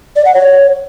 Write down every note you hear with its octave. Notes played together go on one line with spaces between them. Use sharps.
D5
F#5
C#5